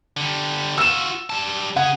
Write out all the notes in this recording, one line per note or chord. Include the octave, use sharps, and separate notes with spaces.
D3 G3
F4 F#4 E6 E7
G3 A5
C#3 G#4 F#5